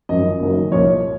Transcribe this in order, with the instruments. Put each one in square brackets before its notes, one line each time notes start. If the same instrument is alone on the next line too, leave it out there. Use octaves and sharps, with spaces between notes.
[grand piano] G#1 F#2 F3 D#5
F#1 F#2 D#3 F#3
C2 A#2 F3 C#5